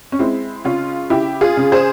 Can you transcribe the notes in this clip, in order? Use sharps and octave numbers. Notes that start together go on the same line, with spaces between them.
C#4
G#3 C4 E4
C#3 C#4 F4
C#3 E4 G4
F4 G#4
C#3
G#4 C5